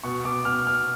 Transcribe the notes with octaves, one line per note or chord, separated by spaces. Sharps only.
B2 C#6
B2 D6
B2 F6
B2 F6